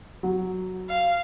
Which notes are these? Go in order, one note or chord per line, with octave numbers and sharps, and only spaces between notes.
F#3
F5